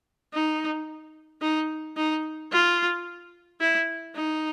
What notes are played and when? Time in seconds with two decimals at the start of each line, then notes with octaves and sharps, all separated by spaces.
0.33 D#4
1.41 D#4
1.96 D#4
2.52 F4
3.60 E4
4.15 D#4